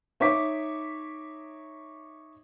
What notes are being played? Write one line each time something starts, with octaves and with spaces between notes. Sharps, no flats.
D#4 C#5 E5 D6 B6